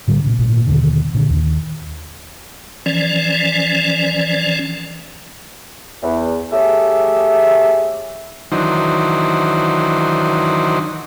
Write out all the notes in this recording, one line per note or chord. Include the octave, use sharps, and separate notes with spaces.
A2 D3 G3
A#2 C#3
G#1 A#2 A#3
D#2 B2 D3 D#3
A#2 D3
D#2
E3 F3 C#4 D5
E2
A3 G4 G#4 C#5 E5
D#3 E3 F#3 D4 D#4 C5